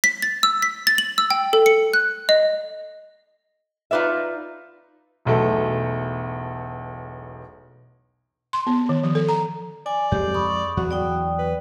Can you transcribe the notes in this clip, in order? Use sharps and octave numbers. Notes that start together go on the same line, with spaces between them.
B6
A6
E6
B6
A6
F#7
E6
G5
A4
C#7
F#6
D#5
D#4 F4 B4 D5 E5
E1 B1 A3 A4
C6
B3
D#3
F3
A4
A#5
D5 G#5
F2 G#3 G4
B5 C#6 D#6
E2 F#3 F#4
D5 G5 D#6
B4